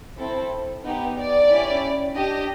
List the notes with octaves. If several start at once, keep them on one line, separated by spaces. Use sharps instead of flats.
C4 E4 A4
B3 D#4 G4
D5
C#4 E4 G4
D4 G4 D#5